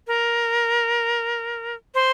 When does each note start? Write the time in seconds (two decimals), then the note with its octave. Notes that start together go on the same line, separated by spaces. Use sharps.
0.07 A#4
1.95 C5